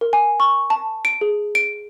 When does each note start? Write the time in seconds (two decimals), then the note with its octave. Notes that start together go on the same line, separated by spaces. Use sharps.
0.01 A#4
0.13 G#5
0.40 C#6
0.70 A5
1.05 D7
1.21 G#4
1.55 D7